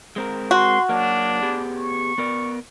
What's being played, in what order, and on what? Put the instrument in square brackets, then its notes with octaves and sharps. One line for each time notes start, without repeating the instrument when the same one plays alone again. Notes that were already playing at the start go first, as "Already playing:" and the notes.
[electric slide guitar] G#3 C4 A#4
[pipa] F#4 [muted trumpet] C6
[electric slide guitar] F#3 A#3 [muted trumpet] D4
[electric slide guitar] B3 G4 G#4
[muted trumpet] C#6
[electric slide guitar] B3 A#4 D5